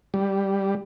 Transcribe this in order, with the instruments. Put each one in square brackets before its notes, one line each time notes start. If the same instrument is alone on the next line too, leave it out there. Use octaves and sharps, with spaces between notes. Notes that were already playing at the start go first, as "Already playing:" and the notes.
[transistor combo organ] G3